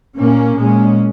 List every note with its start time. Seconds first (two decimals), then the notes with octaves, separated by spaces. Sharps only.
0.17 A#2 A#3 C#4
0.57 A#2 G#3 C#4